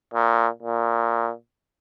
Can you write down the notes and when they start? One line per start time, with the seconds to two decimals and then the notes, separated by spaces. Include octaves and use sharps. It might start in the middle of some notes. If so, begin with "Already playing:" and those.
0.14 A#2
0.63 A#2